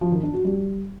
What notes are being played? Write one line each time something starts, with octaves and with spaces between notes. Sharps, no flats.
F3
D#3
D4
F#4
G3